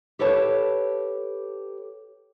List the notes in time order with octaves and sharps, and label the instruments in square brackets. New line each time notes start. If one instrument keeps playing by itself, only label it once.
[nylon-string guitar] G4 A4 B4 C#5 A5